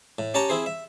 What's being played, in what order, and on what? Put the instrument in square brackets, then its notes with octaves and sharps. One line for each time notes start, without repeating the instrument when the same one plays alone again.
[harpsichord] A2
C#4 G4 C#5 A5 A#5
C4 E4 G#4 C5
E5